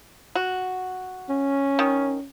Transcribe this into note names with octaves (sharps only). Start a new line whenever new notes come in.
F#4
C#4
D#3